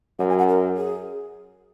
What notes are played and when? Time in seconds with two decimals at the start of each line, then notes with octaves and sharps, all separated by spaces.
0.19 F#2 F#5
0.29 G#5
0.38 F#5
0.48 A#4
0.77 G#4